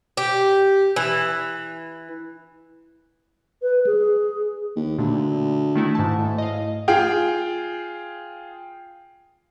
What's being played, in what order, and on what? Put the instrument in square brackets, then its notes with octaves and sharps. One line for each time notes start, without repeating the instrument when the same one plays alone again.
[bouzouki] G4
E3
[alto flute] B4
G#4
[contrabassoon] D#2
[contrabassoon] D2 [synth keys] A#2 D3
[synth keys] D#3 A3 E4
G#2 A5
[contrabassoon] A2
[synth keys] D#5 F5
[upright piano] F4 G#4 G5